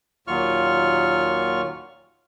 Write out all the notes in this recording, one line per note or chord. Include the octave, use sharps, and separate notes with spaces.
D#2 A#2 F#3 F4 C#6 F6